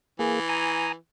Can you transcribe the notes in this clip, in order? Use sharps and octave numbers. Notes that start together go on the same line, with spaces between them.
E3 A#3 G#4
G#5 A#5 D#6